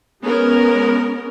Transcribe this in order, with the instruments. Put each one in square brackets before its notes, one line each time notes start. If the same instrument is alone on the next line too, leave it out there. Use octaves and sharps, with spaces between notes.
[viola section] G#3 B3 C#4 A#4